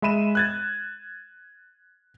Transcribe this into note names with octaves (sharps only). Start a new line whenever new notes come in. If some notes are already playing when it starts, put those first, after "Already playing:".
G#3 E5 B5 D#7 E7
F#6 G#6 A6